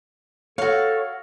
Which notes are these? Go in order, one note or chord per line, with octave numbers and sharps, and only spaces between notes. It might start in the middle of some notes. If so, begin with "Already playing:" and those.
F#4 A4 C#5 F5